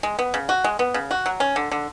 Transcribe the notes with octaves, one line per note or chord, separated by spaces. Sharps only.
G#3
B3
C#3
F#4
G#3
B3
C#3
F#4
F#3
C#4
D3
D3